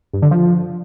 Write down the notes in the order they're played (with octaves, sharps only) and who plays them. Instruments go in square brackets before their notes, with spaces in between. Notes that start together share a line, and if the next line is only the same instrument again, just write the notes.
[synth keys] G2
D3
F3